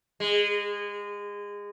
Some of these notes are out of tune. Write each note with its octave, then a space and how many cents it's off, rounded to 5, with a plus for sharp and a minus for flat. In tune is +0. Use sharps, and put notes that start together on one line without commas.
G#3 -25